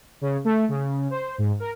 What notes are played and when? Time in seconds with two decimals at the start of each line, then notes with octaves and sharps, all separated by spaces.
0.21 C#3
0.45 A3
0.69 C#3
1.10 C5
1.38 G#2
1.60 A#4